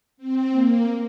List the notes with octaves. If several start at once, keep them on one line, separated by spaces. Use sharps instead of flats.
C4
A#3